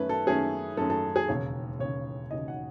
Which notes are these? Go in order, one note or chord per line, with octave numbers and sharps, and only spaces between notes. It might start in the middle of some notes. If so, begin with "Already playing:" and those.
Already playing: F#2 D#3 A3 C#4 B4
A4
F#2 D#3 A3 C#4 G#4
F#2 D#3 A3 C#4 A4
A4
G#4
E1 D#2 C#3 C#5
E1 D#2 C#3 C#5
E1 D#2 C#3 D#5
F#5